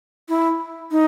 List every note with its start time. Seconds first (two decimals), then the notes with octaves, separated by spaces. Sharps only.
0.29 E4
0.91 D#4